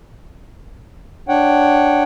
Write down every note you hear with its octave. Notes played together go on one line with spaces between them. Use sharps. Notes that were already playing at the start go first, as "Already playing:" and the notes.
D4 C#5 F#5 G5